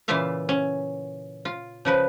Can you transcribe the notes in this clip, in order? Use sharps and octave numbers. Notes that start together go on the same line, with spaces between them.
A#2 C#3 E3 F4 E5 F5
C#4
F4
C#3 F3 B4